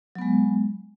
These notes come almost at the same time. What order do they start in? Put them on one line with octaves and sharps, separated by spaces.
F#3 B3 G#3